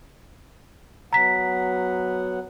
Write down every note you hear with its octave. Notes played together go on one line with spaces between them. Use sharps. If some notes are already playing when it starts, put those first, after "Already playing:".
F#3 B3 F#5 A#5 B6